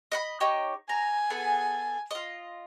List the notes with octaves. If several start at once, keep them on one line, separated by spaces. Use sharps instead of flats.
D#5 F#5 B5
D#4 G4 C#5
G#5 A#5
B3 G#4 A4
F4 D#5